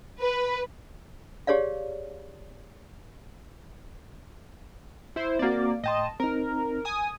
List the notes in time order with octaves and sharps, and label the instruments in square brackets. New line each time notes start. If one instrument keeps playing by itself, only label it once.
[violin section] B4
[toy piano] G4 G#4 C#5 D5 F5
[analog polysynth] E4 C5
[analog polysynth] A#3 D5 [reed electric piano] C4 F#4
[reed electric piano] A2 G5 C6 [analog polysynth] D#5 A5
[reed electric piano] C4 D#4 [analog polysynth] A#4
[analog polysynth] G#5 D#6